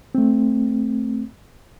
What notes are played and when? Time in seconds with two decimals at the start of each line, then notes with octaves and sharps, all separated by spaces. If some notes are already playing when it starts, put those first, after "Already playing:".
0.15 A3 C4